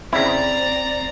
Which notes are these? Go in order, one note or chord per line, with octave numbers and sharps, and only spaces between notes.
C#3 C4 E4 D5 A#5